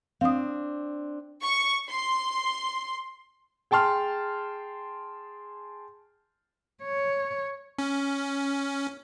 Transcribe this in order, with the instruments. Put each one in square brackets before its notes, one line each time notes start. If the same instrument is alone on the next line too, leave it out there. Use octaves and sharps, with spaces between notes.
[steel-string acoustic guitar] C4 D4 [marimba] F5 D#6
[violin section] C#6
C6
[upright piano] G#4 G5 A5 C6 F6
[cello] C#5
[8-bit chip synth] C#4